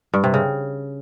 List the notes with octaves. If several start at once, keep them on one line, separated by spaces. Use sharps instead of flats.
G2
C3
C#3